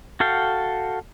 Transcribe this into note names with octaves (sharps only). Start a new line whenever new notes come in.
F#4 A4 F5 G5